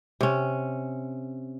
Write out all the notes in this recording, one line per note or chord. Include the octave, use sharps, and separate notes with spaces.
C3 C#4